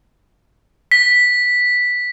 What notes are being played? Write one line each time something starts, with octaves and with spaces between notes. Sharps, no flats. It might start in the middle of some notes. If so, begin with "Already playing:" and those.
B6